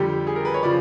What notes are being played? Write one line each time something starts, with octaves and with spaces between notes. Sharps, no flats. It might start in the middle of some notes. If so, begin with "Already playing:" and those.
Already playing: F2 D3 G3 G4
G#4
A#4
B4
C#5
C#3 F3 D5